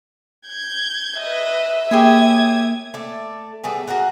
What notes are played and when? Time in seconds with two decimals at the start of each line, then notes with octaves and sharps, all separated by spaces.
0.46 G6 G#6
1.20 B4 D#5 E5
1.91 A#3 G4 G#4 C#5 D#6 G#6
2.94 A3 A4 D5
3.64 G3 A3 B3 G#4
3.87 F#4 G#4 A#4 F#5